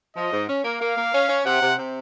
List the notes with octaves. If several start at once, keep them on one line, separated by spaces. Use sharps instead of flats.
F3 D#5
G#2
C#4
A#3
A#3 F5
A#3
C#4
C#4
C3 F#5
C3
C3